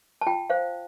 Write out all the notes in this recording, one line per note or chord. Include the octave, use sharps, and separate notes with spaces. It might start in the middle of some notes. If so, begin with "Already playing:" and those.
A5
F4 G5
C5 F5